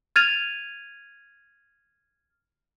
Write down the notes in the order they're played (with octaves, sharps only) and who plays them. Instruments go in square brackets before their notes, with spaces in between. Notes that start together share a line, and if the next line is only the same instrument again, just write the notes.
[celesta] F6 G#6 A6 D#7 F7